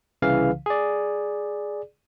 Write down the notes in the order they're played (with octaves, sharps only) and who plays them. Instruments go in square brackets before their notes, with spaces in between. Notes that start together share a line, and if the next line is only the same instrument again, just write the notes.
[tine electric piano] C2 C#3 E3 F5
G#4 D5